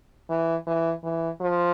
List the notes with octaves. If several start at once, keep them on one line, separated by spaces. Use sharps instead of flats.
E3
E3
E3
F3